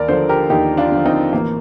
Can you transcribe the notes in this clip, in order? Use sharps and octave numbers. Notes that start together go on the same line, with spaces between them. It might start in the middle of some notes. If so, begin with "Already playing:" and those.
Already playing: D#2 A#4 D5
D3 F3 A4 C5
G4 A#4
D#2 D#4 G4
D4 F4
D3 F3
C4 D#4
A1 A#3